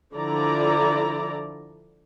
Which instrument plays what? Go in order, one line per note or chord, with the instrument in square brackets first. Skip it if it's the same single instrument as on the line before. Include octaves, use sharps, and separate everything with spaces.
[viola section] D3 F3 E4 D5 A#5